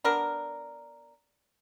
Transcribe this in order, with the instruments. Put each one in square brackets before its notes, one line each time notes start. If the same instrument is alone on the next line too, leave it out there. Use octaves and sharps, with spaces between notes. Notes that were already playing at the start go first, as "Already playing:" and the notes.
[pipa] B3 D4 A#4